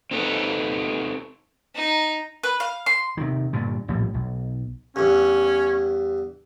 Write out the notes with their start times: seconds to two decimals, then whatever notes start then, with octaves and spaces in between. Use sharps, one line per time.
0.11 C4 D#4 A4 B4 C#5
1.75 D#4
2.43 B4
2.60 F5
2.86 C6
3.17 C3 D#3
3.53 G2 A#2 D3
3.88 A#1 A2 F3 G3
4.14 B1
4.96 E2 G2 C#4